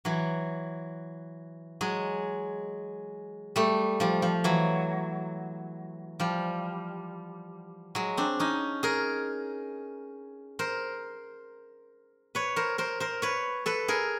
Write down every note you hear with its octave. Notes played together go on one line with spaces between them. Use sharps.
E3 F#3
F#3 G#3
G3 A3
F3 G3
F3
E3 F#3
F3 G3
F#3 G#3
C4 D4
C#4 D#4
G#4 A#4
A#4 C5
B4 C#5
A#4 C5
A#4 C5
A#4 C5
B4 C#5
A4 B4
G#4 A#4